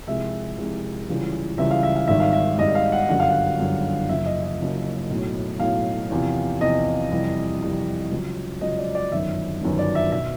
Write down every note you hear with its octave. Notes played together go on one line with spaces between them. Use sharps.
C2 C3 F3 G#3 E5
C2 C3 F3 G#3
C#2 C#3 E3 G3
C#2 C#3 E3 G3 E5
F5
E5
F5
G#1 G#2 D#3 G3 E5
F5
E5
G#1 G#2 D#3 G3 D#5
F5
F#5
G1 F#2 D3 G3 F#5
F5
F#5
G1 F#2 D3 G3
F#1 F#2 C#3 F3 E5
D#5
D#5
F#1 F#2 C#3 F3
B1 A2 F#3
B1 A2 F#3 F5
E2 C3 F3
E2 C3 F3 D#5
F2 C3 E3 G3
F2 C3 E3 G3
C#2 C#3 F#3
C#2 C#3 F#3 D#5
D5
D5
G1 F#2 D#3 F#3 E5
G1 F#2 D#3 F#3
D5
E5
B2 E5